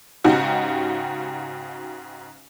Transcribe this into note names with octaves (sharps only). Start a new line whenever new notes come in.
G#2 C#3 D#4 F#4 G4